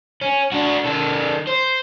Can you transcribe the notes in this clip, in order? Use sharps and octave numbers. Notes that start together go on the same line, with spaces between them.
C#4
D4 F#4
D#3 A4
C5